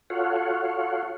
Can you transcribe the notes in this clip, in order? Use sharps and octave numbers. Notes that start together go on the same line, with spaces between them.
F4 F#4 A4 C#5 F5 F#5